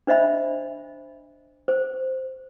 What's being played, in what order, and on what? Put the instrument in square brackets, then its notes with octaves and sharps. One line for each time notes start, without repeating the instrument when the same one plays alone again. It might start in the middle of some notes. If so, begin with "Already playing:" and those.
[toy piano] D4 C5 D#5 E5 B5
C5